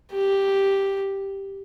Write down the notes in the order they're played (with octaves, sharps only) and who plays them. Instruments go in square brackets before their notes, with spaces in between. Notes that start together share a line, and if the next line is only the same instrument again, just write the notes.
[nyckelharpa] G4